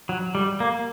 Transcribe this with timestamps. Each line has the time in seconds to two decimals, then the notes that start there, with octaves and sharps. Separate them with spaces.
0.09 F#3
0.35 G3
0.60 A#3